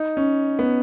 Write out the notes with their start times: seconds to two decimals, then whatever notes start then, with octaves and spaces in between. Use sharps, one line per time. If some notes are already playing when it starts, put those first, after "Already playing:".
Already playing: D#4
0.17 C#4
0.59 B3